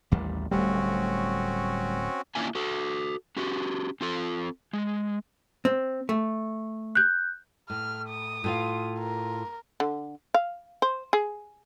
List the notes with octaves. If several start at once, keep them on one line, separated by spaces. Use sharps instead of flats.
A1 D#2 G3
D1 G3 A3 C4 C#4 F#4
A#3 C#4 D4 E4 F4 G#5
F#4 A4
C#4 F#4 G4
C4 F4 A4
G#3
C4
A3
F#6 G6
A2 F6
D#6
A2 F4 F5
A#4
D3
F5
C5
G#4